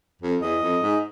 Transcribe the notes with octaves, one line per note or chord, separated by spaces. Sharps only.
F2
E2 D#5
F2
G#2